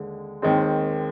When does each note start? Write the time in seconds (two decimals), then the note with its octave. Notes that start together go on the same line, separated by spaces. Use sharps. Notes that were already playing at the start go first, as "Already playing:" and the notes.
Already playing: D#2 D3 G#3
0.42 D#2 D#3 G#3 C4